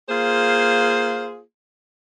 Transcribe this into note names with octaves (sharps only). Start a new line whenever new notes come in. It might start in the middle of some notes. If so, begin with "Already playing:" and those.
A#3 F4 G#4 C5